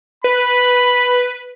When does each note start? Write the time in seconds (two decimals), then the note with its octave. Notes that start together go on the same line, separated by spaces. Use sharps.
0.24 B4 B5